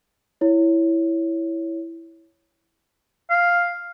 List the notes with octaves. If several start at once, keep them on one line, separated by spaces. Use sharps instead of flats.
E4 C#5
F5